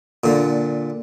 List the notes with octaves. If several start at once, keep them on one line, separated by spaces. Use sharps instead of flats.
A#2 D3